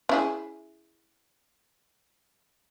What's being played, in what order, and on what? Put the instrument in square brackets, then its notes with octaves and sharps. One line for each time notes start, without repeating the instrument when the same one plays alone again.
[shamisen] C#4 E4 G#4